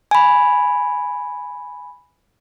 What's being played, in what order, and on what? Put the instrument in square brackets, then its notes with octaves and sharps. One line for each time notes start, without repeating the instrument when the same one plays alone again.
[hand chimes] G#5 B5